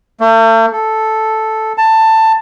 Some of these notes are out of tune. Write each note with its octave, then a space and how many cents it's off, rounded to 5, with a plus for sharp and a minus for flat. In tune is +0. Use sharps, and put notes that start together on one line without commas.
A3 +45
A4 -5
A5 +15